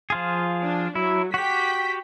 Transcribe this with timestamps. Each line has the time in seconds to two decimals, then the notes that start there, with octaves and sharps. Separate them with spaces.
0.10 F3 F4 G#4
0.62 D4
0.95 F#3 E4
1.34 F#4 G4 G5 B6